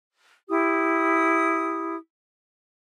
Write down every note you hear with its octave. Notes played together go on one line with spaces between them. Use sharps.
E4 G4 D#6